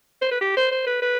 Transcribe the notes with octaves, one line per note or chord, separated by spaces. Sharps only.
C5
B4
G4
C5
C5
B4
B4